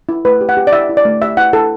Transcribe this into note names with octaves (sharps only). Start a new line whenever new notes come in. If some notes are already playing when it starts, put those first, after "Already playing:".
E4
A3 B4
G4
F#5
G4
D5
E4 E5
E4
D5
A3
G4 E5
E4 F#5
E4 A4